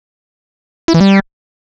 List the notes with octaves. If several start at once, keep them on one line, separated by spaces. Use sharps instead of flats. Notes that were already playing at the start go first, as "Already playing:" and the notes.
E4
E3
G3